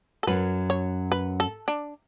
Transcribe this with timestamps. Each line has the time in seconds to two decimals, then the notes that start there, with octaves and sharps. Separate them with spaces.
0.23 A4
0.27 F#2 F#3 B4
0.70 C#5
1.12 B4
1.40 A4
1.68 D4